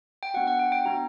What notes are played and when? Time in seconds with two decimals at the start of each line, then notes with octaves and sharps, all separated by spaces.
0.23 G5
0.34 B3 D4 F#4 F#5
0.47 F#5
0.59 G5
0.72 G5
0.85 B3 D4 F#4 A#5